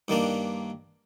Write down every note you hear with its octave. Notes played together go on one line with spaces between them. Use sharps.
G2 D#3 A#3 D4